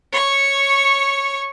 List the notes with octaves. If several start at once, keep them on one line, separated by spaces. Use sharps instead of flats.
C#5 C#6